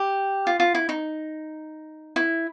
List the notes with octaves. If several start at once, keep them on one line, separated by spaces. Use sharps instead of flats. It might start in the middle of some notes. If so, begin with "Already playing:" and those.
Already playing: G4
F4
F4
E4
D#4
E4